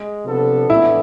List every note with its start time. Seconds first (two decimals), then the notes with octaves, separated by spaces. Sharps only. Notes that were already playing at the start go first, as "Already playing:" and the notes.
Already playing: G#3
0.25 C3 F3 B3 D4 A4
0.70 A2 E3 B3 D4 E4